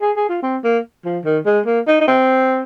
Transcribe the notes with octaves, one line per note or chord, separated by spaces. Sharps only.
G#4
G#4
F4
C4
A#3
F3
D#3
G#3
A#3
D#4
D#4
C4